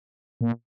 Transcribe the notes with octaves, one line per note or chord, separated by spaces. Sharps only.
A#2